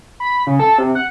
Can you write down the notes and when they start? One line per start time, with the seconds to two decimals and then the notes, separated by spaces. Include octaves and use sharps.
0.20 B5
0.47 C#3
0.59 A4
0.78 C3
0.95 F#5